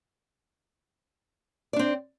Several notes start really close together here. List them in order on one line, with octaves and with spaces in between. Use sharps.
D5 D4 C4